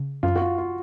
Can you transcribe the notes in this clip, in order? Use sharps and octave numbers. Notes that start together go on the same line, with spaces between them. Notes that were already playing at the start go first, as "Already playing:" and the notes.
Already playing: C#3
F#2 F4
F#4
F4
F4